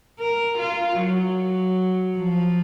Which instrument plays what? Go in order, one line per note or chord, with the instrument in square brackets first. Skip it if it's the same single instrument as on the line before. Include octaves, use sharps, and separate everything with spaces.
[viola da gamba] A#4
F4
F#3
F3